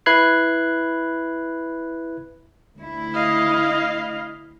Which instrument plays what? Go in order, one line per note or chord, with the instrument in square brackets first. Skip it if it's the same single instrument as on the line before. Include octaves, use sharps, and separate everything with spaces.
[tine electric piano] E4 B4 B5 F#6 G#6 C7
[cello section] D2 E4
[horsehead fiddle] D#5 F5